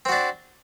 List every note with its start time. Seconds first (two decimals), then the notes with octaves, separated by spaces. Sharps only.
0.05 C4
0.09 F#4
0.12 D4